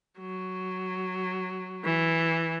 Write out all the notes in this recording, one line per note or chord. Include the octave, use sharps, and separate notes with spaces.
F#3
E3